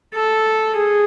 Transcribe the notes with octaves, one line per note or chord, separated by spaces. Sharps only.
A4
G#4